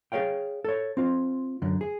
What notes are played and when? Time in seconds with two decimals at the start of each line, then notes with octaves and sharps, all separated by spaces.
0.12 G#4 A4 C#5 F5 G5
0.64 A4 C#5
0.97 C4 F4
1.62 F#2 D3
1.81 G#4